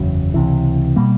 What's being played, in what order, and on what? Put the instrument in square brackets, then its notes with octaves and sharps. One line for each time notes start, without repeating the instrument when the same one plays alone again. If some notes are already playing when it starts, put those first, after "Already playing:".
Already playing: [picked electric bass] F#1 E2 C#3 F#3
C#2 C3 E3
B2 G3 A#3